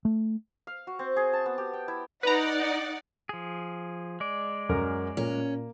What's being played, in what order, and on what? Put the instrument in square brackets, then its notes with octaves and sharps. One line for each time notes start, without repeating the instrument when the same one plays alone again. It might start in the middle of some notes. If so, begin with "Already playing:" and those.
[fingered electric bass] A3
[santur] F5
F#4
C4
G#4
A5
B3
G4
G5
E4
[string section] D#4 D5 F#5 [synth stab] B4 A#5
[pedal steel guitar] F3 G#4
G#3 D5
[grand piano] F#2 A#4
[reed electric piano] A#2 [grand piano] A#3 [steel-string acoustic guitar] C#4